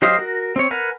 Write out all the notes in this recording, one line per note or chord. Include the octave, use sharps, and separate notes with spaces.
F#3 G4 C5 D#5 F5
F#4 A#4
C4 C#5
A#4 B4 F#5 G#5 A#5